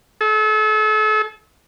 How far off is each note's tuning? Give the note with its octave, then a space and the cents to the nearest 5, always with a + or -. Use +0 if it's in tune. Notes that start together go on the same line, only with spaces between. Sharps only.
A4 -40